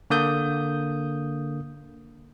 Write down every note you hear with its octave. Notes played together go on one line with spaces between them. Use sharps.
D3 A#3 D#6 G6